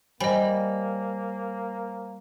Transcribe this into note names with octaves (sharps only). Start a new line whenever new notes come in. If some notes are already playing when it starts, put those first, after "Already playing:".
G3 A#3 C5 C#5 D#5 G#5 B5